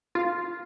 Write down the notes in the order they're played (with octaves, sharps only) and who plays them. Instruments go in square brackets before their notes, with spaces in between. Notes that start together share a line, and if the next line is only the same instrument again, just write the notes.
[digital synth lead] F4